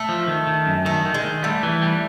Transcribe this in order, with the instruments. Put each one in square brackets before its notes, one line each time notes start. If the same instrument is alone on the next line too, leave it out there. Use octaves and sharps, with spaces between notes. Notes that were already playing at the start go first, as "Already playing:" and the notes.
Already playing: [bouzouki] A3
[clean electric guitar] F3
D#3
D#3
F#2
[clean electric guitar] D#3 [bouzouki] A3
[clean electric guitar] D#3
[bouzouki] G#3
[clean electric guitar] D#3
[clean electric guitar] G3 [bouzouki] A3
[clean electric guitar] E3
G3